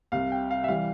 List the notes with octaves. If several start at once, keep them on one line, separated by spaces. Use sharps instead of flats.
C2 C3 G3 F5
G5
F5
E5
E3 G3 F5